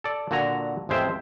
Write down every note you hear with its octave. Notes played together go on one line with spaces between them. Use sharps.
A4 D5
A#2 D3 F#4 G#5 A#5
A1 F2 G#3 C5 E5 G5